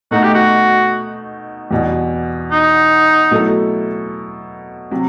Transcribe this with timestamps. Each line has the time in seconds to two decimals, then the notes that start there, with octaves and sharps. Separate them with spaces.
0.11 B2 A3 D#4 F#4
0.23 G4
0.34 F#4
1.71 E2 B2 G3
2.52 D#4
3.31 B2 F#3 A3 E4 A4
4.91 C3 F#3